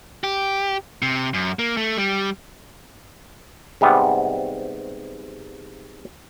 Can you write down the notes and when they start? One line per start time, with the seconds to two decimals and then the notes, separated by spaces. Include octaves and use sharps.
0.24 G4
1.02 C3
1.34 F#2
1.59 A#3
1.77 A3
1.97 G3
3.81 G#2 C3 G3 B3